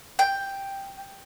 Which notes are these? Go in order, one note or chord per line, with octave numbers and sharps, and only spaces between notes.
G5